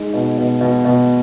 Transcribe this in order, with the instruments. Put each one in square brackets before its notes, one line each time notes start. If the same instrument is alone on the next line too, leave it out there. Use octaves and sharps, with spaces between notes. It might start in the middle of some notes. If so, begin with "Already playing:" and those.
Already playing: [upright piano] G#3 D#4
B2
B2
B2
B2